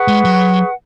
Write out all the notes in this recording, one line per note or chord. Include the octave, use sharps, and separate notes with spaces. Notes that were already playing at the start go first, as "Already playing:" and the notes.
Already playing: G#4 B4 F#5 C#6
G#3
F#3